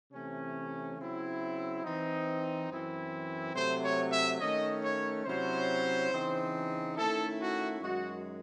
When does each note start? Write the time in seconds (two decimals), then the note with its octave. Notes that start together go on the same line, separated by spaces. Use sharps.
0.12 C3 E3 A3 C#4
0.97 C#3 F#3 C4 E4
1.83 E3 C4 D#4
2.69 F#2 E3 C4 E4
3.54 C3 F#3 A3 C5
3.82 C#5
4.12 E5
4.40 D#3 A3 C#4 D#5
4.82 C#5
5.25 C3 F#3 C#4 E4 C5
6.11 C#3 E3 C4 D#4
6.96 D#3 A3 C#4 E4 A4
7.39 F#4
7.82 F#2 D#3 G#3 F#4